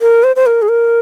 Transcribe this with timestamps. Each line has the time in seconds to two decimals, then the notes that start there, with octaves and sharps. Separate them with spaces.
0.01 A#4
0.23 C5
0.36 C5
0.46 A#4
0.62 G#4
0.69 A#4